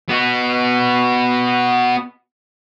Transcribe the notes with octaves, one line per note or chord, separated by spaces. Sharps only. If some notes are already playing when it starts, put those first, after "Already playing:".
B3 F#4